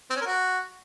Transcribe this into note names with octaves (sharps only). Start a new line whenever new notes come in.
C4
C#4
A#4
F#4